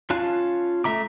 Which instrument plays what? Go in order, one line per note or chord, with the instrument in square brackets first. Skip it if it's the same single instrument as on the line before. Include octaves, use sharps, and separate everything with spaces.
[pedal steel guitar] C#4 F4 F5 A5 F#6
A3 E5 A#5 D6